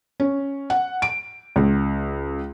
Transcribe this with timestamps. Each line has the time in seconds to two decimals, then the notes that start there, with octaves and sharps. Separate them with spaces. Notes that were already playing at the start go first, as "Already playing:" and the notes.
0.20 C#4
0.70 F#5
1.02 D7
1.56 C#2